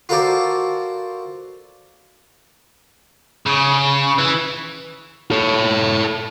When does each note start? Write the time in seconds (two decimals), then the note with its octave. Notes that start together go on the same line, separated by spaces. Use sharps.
0.09 F4 F#4 A4 A#4 C5 D5
3.46 C#3
4.18 E3
5.31 A4 C#5